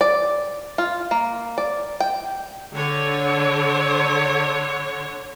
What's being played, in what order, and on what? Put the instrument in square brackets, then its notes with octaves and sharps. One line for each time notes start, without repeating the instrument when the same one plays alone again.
[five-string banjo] D5
F4
A#3
D5
G5
[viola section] D3 C#5